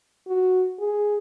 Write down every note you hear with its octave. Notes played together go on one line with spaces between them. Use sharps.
F#4
G#4